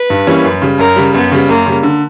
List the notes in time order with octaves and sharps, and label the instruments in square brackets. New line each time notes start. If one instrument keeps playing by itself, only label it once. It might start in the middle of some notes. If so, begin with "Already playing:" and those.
Already playing: [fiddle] B4
[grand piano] G2
E3 G3 A#3 C#4
F#2
C#3 G3
[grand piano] F#2 [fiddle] A#4
[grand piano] C#3 G3
[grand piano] F#2 [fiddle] B3
[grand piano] C#3 G3
[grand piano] F#2 [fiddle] A#3
[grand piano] C#3 G3
D3